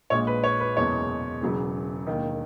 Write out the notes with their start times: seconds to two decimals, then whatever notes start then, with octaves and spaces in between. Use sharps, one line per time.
0.10 A#1 A#2 G#3 C#5
0.27 B4
0.44 C#5
0.60 B4
0.76 F#1 E2 B2 G#3 C#5
1.42 E1 E2 C#3 F#3
2.07 E1 D#2 D#3